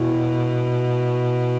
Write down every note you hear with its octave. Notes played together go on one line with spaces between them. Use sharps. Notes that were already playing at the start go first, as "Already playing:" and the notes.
Already playing: B2 E4 F#4